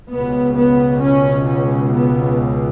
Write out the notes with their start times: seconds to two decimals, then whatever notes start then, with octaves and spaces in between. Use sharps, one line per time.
0.12 C#2 B2 B3
0.57 B3
1.02 C#4
1.48 C#4
1.93 B3